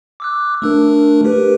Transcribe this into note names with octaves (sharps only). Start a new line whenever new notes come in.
D6 E6 F#6
A3 D4 A#4
G4 A#4 B4